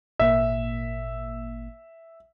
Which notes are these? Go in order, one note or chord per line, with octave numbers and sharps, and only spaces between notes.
G#1 A#2 A#3 E5